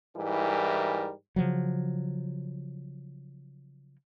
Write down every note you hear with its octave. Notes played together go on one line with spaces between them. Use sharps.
G#2 E3 G3 E4 A#4
C#3 F3 F#3